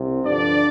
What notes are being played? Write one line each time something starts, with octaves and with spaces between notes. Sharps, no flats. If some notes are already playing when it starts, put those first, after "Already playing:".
Already playing: C2 C3
G2 D3 F3 D4 D5